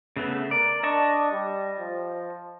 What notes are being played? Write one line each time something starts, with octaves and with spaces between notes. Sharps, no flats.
C#3 A3 B3
A#4 D5
D4 D#5 A5 C#6
G3
F3